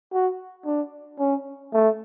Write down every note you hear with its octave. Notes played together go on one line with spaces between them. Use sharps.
F#4
D4
C#4
A3